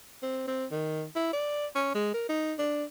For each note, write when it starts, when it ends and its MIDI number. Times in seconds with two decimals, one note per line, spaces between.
0.23 0.45 60
0.48 0.66 60
0.71 1.05 51
1.16 1.33 64
1.33 1.67 74
1.75 1.91 61
1.95 2.14 56
2.14 2.25 70
2.29 2.54 63
2.59 2.84 62